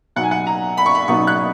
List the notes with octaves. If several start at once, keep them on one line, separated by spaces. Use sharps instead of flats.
B2 F#3 B3 D#4 F#5
G#5
F#5
A#5
B5
C#6
B5
B2 F#3 B3 D#4 C#6
F#6